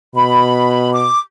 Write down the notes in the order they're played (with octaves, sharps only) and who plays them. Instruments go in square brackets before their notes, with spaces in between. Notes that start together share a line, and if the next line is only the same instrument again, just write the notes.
[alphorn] B2 [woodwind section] B5
[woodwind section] D6